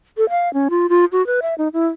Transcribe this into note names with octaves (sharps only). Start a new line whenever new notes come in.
A4
F5
C#4
F4
F4
F#4
B4
E5
D#4
E4